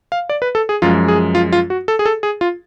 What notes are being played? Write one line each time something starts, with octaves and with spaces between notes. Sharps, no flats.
F5
D5
B4
A4
G#4
F#2 F3 G#3 F4
G#4
F4
F4
F#4
A4
G#4
A4
G#4
F4